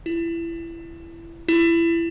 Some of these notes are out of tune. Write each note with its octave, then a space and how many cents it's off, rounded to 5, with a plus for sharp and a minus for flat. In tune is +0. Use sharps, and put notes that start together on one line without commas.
E4 +25
E4 +25